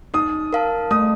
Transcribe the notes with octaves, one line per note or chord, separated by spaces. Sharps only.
D#4 D#6
A#4 F5 A5
A3 D#6